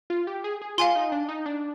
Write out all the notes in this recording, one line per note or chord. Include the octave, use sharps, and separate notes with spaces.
F4
G4
G#4
G#4
F4 F5 G#5 C6
D#4
D4
D#4
D4